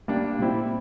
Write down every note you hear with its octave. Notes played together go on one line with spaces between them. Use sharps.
G3 A#3 D4
A#2 G3 C4 E4